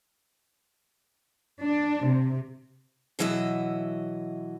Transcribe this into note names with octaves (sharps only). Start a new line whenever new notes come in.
D4
C3
B2 E3 F#3 D#5 E5